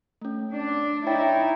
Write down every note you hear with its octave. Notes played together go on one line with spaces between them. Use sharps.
A3 C#4
D4
D#4 E4 C#5 G5 A6